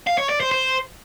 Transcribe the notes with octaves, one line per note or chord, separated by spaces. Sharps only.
F5
C#5
D5
C5
C5